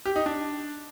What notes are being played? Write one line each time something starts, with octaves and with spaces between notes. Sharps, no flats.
G4
D#4
D4